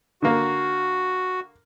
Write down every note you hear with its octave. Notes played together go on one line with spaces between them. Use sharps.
D3 A#3 F#4